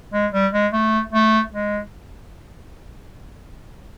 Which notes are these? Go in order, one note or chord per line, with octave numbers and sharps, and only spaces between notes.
G#3
G3
G#3
A3
A3
G#3